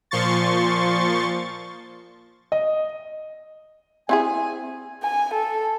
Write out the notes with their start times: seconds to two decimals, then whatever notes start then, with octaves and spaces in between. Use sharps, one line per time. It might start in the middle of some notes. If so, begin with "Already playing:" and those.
0.11 A#2 F3 C6 C#6 A6
2.52 D#5
4.09 C4 E4 G#4 G#5
5.03 G#5
5.34 A4